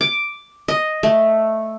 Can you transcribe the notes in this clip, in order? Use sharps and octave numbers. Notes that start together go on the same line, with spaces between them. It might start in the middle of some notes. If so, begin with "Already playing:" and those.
D6
D#5
A3